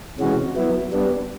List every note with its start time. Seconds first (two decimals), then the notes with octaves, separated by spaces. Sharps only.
0.19 C3 E3 G#3 C#4 F#4
0.56 F#3 B3 E4
0.93 G3 B3 D4